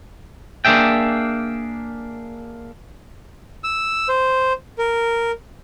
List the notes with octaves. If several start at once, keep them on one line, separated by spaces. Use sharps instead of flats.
A#3 D4 G#4 E5 G5
E6
C5
A#4